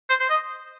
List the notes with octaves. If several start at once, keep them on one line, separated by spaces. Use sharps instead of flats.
C5
C5
D#5